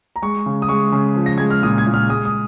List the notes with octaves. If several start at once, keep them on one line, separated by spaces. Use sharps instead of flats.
A#5
G#3 C#6
C#3
D#6
G#3 C#6
C#3
F3
A#6
G#3 G#6
F6
A#2 D#6
G#6
A#2
F6
G#3 D#6
D#6